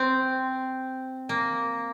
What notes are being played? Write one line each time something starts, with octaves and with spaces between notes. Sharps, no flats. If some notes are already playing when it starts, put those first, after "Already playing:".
Already playing: C4
A#3